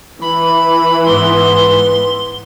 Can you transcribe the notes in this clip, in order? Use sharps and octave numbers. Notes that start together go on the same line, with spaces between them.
E3 B5
G#2 B3 C6